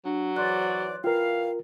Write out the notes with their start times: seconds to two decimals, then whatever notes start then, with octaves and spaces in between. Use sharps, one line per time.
0.05 F#3 D4
0.36 G#2 E3 C#5 D5 C6 F#6
1.04 E3 F4 A#4 F5 G5